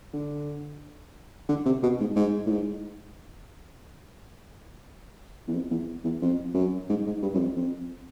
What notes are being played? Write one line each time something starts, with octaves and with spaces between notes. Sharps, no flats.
D3
D3
C3
B2
G#2
G#2
A2
G#2
E2
F2
E2
E2
F2
F#2
G#2
G#2
G2
F#2
F2
F2